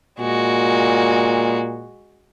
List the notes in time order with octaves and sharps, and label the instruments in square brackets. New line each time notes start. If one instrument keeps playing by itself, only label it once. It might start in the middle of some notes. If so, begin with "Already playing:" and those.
[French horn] A#2 [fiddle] G#3 F#4